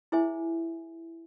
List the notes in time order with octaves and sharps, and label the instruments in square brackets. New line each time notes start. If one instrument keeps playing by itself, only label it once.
[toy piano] E4 G#4 C5 E5 G#5